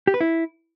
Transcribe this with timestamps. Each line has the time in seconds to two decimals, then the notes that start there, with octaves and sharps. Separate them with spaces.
0.07 G4
0.14 B4
0.21 E4